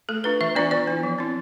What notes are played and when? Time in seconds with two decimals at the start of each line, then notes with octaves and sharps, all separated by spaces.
0.09 A3 A4
0.24 D4 F4 B4
0.41 E3 E5
0.55 B3 D4 F4 D5
0.71 E3 D5
0.87 B3 E4
1.03 F3
1.19 C4 E4